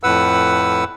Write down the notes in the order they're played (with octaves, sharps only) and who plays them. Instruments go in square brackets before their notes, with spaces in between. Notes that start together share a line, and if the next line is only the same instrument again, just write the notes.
[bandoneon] F2 A2 B4 F#5 E6